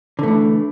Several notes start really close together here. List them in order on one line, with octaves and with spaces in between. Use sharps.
D3 A3 E3